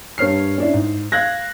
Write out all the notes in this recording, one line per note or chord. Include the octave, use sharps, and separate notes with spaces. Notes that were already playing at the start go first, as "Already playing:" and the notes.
G2 A#4 C#5 F6 C7
C#4 D4 E4
G#2
F5 F#6 G#6 A#6